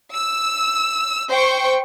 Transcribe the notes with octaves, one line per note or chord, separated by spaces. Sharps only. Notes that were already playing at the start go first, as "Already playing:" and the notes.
E6
C5 G5 C#6